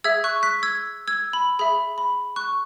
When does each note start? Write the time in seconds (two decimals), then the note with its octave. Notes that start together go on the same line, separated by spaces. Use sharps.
0.04 G#4 E5 E6 G#6
0.24 C#6 F#6
0.43 F#6 B6
0.63 E6 G#6
1.08 E6 G#6
1.33 B5
1.59 G#4 E5 B5
1.98 B5
2.36 C#6 F#6